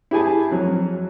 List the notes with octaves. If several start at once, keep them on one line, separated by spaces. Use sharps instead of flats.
E4 G4 G#4 G#5 A5
F2 F#3